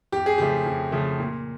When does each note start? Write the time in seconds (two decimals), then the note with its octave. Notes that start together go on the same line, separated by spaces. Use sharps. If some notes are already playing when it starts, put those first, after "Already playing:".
0.12 F2 G4
0.26 G#4
0.38 C#3 F3 A3 G4
0.66 F2
0.92 C#3 F3 A3
1.19 A#2